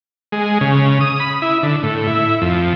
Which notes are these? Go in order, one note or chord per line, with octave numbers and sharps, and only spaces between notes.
G#3
C#3
D#6
B5
E4
D3
A2
E4
F2